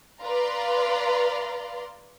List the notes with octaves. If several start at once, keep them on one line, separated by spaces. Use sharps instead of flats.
B4 D5 F5 A#5 C6